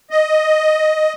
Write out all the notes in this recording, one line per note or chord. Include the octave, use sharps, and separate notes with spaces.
D#5